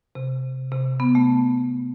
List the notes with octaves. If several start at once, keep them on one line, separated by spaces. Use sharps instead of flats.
C3
C3
B3
A3